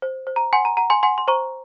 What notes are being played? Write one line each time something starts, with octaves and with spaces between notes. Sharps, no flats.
C5
C5
A#5
F#5 G#5 C6
A#5
F#5 A#5
G#5 C6
F#5 G#5 C6
C6
C5 A#5 C#6